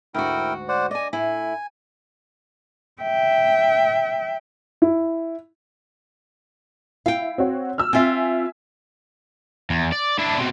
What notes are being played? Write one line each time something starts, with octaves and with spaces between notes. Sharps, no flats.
D2 G#2 E4 F#4 A#4 G5
C5 D5 F#5
D5 D#5 G#5
A2 E4 G#5
E5 G5
E4
E4 F5 G5
C4 F#4 C#5
E6 F6
C4 F4 E5 G#5
E2
D5
D4 E4
B2 C4